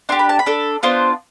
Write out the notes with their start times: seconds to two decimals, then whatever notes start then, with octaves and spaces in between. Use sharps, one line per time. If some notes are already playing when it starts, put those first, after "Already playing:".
0.09 D4 G4 C6
0.19 B5
0.29 A5
0.39 B5
0.46 D4 A4
0.83 B3 D4 F4 C5